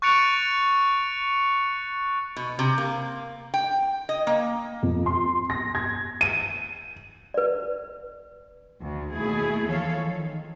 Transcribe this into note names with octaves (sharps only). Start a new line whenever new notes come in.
C#6 F#6 A6 C#7 D7 F7
B2
C3
A#3
G5
D#5
A#3
F2
C6
A#6
G#6
D#7
B4 D5
D2
D#2 B2 A3 E4 G#4
E3 F3 A4 C#5 F5
D#3